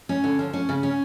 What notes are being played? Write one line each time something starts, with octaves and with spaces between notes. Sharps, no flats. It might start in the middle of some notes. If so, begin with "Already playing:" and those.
C#4
D3
F3
C#4
C#3
C#4